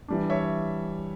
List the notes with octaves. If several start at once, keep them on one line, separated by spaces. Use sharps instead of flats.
E3 G3 D4
C#5 E5